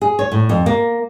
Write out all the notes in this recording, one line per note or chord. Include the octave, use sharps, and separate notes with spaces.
G#4
C#5
A2
F2
A#3